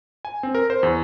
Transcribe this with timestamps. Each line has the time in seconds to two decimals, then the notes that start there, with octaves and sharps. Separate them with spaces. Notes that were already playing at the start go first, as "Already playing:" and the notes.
0.25 G#5
0.43 C4
0.55 A#4
0.70 C5
0.83 E2